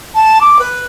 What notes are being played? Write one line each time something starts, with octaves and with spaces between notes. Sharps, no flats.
A5
D6
B4